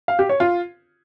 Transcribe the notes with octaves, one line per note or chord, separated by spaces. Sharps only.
F5
G4
C#5
F4